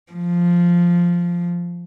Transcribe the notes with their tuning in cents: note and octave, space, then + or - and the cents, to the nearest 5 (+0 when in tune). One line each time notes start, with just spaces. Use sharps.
F3 -5